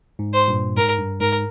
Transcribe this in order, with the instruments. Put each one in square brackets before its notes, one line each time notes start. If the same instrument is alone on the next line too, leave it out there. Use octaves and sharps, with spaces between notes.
[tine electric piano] G#2
[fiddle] C5
[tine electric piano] G2 A#2
[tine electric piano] G#2 [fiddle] A#4
[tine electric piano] G2
[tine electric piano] G#2 [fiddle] A#4